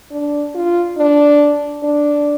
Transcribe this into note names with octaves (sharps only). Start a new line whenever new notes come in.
D4
F4
D4
D4